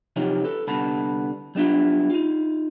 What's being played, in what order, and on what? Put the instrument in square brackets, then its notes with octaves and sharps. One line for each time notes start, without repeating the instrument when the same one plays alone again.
[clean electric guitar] C3 F3 F#3 C#4 D#4 G4
A4 B4
C2 D3 B3 A5 B5
F#3 G3 B3 D4 E4 F4
D#4 F4